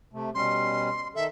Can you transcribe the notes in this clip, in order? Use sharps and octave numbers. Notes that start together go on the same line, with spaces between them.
C3 A3
B2 G3 C#4 C6
D#3 A4 E5